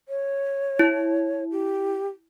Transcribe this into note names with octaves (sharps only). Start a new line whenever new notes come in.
C#5
E4
G4